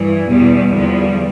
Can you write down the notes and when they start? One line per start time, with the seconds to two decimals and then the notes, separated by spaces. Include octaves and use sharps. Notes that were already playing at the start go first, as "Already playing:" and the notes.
Already playing: G2 E3
0.28 E2 B2 G3
0.71 E2 D3 F3 G3